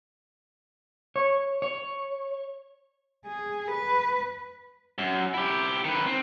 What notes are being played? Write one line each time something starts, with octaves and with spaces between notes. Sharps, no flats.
C#5
C#5
G#4
B4
F#2
E4 G4
D#3 B4
C4